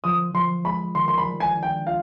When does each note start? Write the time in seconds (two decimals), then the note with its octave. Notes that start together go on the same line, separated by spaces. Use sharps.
0.04 F3 D#6
0.34 F3 C6
0.64 G#3 B5
0.95 D#3 C6
1.08 C6
1.18 B5
1.25 G3
1.40 G#5
1.56 D4
1.63 G5
1.86 F4 F5